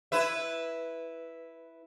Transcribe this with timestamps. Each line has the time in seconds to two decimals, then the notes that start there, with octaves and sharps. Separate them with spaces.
0.12 E4 B4 E5